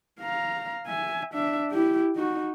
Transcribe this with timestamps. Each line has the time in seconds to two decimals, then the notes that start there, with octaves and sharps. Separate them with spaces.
0.20 F5 A#5
0.87 E5 G#5
1.34 D4 E5
1.72 E4 G4
2.16 D#4 F#4